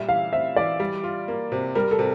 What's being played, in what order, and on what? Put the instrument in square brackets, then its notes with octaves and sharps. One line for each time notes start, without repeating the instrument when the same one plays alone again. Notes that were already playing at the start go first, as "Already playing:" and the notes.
Already playing: [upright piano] A#2 G3 [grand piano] E5
[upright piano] E3 [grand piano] F5
[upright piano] C4 [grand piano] E5
[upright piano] E3 [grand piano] D5
[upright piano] G3
F4
A#3
C3
[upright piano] G3 [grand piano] A#4
[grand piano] A4
[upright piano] C3